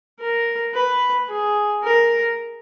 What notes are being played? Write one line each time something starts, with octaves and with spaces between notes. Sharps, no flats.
A#4
B4
G#4
A#4